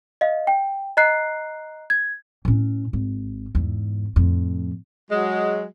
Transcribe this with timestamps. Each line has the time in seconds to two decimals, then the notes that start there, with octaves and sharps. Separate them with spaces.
0.21 D#5 F5
0.47 G5
0.97 D#5 A#5 F#6 C7
1.90 G#6
2.45 A2 C#4
2.93 G#1
3.55 E2 G#2
4.16 F2 A2
5.10 F#3 G#3